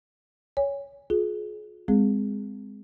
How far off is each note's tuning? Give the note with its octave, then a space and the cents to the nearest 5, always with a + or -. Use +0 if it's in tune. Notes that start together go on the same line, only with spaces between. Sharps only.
C#5 +15 G#5 -25
F4 +40 G#4 +30
G#3 -20 C4 -15 G#4 +0